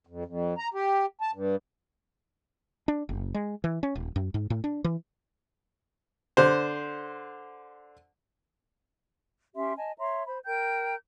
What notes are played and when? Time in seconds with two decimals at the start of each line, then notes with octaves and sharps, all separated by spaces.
0.07 F2
0.25 F2
0.58 A#5
0.74 G4
1.21 A5
1.33 G2
2.88 D4
3.09 F#1
3.34 G#3
3.64 E3
3.83 C#4
3.95 D#1
4.16 F#2
4.34 G#2
4.50 A2
4.64 D4
4.84 E3
6.37 D3 C5
9.55 C#4 G4 E5 C6
9.77 D#5 G#5 A5
9.99 C#5 E5 A#5 C6
10.26 C5 B5
10.46 A#4 G5 A#5 G6